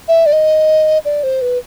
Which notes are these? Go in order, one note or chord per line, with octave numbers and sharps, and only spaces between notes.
E5
D5
D#5
D5
C5
B4